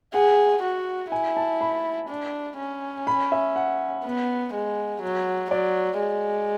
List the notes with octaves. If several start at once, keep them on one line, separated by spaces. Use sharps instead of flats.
G#4 F#5
F#4
E4 G#5
A5
B5
D4
C#4
B5
E5
F#5
B3
G#3
F#3
F#3 D5
G#3